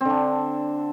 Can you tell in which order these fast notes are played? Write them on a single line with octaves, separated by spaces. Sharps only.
C4 D3 D4